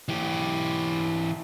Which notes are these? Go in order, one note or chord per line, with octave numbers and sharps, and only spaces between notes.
E3 G4